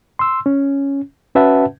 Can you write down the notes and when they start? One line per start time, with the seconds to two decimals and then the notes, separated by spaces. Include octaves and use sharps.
0.19 C6 E6
0.46 C#4
1.35 C#4 F#4 B4 E5 F#5 A5